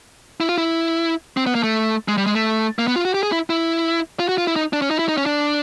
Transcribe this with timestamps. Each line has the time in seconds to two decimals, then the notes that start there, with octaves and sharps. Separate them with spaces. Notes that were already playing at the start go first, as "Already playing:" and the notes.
0.40 E4
0.49 F4
0.58 E4
1.37 C4
1.46 B3
1.55 A#3
1.63 A3
2.08 G#3
2.18 G3
2.26 G#3
2.35 A3
2.79 A#3
2.87 B3
2.96 F4
3.05 F#4
3.14 G4
3.23 G#4
3.32 E4
3.50 E4
4.19 F4
4.29 F#4
4.38 F4
4.47 E4
4.56 D#4
4.73 D4
4.82 C#4
4.91 D#4
4.99 E4
5.08 D#4
5.17 C#4
5.26 D4